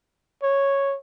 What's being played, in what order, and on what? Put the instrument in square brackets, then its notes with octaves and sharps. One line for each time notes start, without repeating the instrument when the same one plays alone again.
[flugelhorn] C#5